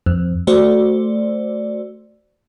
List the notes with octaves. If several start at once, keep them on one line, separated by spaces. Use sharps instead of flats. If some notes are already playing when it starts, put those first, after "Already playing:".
F2
A3 F#4 C5 D5